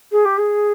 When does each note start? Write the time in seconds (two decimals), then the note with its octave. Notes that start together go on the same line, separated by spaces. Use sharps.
0.12 G#4
0.25 G4
0.38 G#4